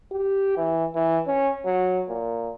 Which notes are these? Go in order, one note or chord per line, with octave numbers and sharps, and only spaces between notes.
G4
E3
E3
C#4
F#3
A#2